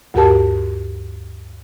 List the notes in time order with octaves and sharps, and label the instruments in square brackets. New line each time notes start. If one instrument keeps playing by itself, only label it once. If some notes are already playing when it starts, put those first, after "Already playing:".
[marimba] D2 G2 F#4 G4 A#4 A5